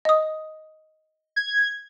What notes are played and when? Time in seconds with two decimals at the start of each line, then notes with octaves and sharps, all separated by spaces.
0.05 D#5 D#6
1.36 G#6